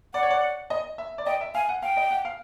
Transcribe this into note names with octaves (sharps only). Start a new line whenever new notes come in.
D5 F#5
C#5
D5
D#5
E5
D5
D#5 G5
E5
F5 G#5
F#5
F5 G5
D#5
F#5
F5